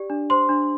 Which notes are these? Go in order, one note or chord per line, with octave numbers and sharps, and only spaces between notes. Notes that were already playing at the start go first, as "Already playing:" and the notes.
Already playing: G4 D5
D4
C5 C6
D4